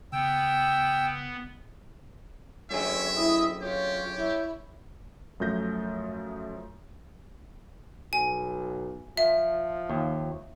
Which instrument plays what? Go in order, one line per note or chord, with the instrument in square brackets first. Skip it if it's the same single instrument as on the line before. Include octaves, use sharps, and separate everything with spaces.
[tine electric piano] C#3 [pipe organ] B3 [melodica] G5 E6
[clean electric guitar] F#2 D3 G#4 [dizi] C#5 [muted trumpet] E5
[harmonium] E4 D#5 [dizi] D#6
[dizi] F4 [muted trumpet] G4 [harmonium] C#5
[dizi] E4
[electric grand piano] F#2 F3 A3 G6 A#6
[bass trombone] B1 [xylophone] G#5
[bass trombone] F3 [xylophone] E5
[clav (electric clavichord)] D#2